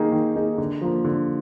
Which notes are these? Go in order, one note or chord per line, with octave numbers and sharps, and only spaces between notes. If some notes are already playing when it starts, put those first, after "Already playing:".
Already playing: D#3 A#3 D#4 G#4
D#3
A#3 D#4 G#4
D3
F3 A#3
D3